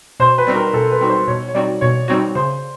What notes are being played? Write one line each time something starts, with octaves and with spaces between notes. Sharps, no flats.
B2 C5
B4
G3 C4 D#4 F#4
A#4
B2 A4
B4
G3 C4 D#4 F#4
C5
B2 C#5
C#5
G3 C4 D#4 F#4 D5
B2 C#5
G3 C4 D#4 F#4 C#5
C#3 C5